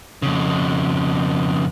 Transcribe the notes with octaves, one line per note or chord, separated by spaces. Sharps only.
F2 C#3